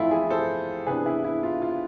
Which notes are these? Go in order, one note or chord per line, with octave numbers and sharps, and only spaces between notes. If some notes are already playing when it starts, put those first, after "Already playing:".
Already playing: F2 E3 A3 E4 F4
E4 G#4
A4 C5
C3 E3 B3 D4 G#4 B4
E4 G#4
E4
F4
F4